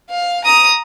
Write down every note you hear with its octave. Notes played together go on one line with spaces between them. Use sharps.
F5
A#5 D#6